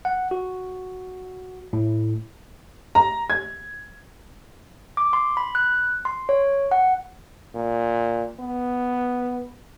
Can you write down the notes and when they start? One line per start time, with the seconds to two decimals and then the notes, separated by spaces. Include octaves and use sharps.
0.05 F#5
0.31 F#4
1.73 A2
2.95 A#5
3.30 G#6
4.97 D6
5.13 C6
5.37 B5
5.55 F#6
6.05 C6
6.29 C#5
6.71 F#5
7.55 A#2
8.40 B3